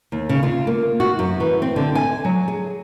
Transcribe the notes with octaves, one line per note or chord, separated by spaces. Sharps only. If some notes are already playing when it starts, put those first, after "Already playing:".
D#2
C#3
F4
A#3
F#4
F#2
E3
C4
D3
G#5
F#3
G#4